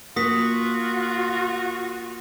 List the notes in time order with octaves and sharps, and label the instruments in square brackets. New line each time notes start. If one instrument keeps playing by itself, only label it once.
[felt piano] A#3 [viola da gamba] F4 [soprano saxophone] F#4 [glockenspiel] D#6 B6